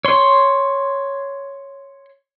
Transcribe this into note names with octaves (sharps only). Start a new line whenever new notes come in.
C#5 C6